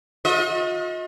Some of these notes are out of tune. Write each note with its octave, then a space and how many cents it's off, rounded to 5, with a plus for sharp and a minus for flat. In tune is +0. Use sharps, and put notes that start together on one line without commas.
F4 +45 D#5 +35